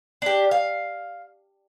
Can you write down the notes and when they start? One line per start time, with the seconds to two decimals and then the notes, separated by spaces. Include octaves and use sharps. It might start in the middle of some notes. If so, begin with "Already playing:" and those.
0.22 D4 G4
0.51 F5